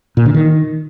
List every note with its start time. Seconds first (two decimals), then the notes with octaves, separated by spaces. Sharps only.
0.17 A#2
0.26 D3
0.34 D#3